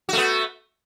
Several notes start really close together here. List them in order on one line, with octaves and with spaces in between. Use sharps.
F#4 A3 B3